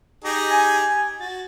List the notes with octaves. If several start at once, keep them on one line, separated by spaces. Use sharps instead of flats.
D#4 G4 G#4 A#6
G#5
F#4 A6